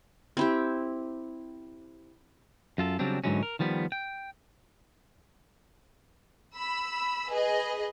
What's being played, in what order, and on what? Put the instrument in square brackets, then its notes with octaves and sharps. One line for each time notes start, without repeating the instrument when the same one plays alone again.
[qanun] C4 E4 G4
[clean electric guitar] F#2 F4 A4
C#3 F#3 G3 C4 D4
G#2 D3 E3 F#3 G#3 C#4
A#4
D#3 F3 G3 B3
G5
[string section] B5 E6
G#4 B4 D#5